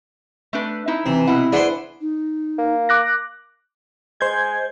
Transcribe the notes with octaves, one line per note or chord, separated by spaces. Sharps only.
A3 D4 B4
D#4 E4
C3 E3
B2 E4 F#5
D4 G#4 B4 C5 F#5
D#4
A#3
D6 F#6 A#6
G#3 C5 G6 G#6